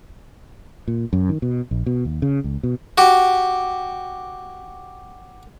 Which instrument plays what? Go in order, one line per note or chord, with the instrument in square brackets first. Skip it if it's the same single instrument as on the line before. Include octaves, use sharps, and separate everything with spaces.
[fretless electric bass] A#2
F#2
D#3
B2
A#1
B2
D#2
C#3
C#2
B2
[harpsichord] F#4 G4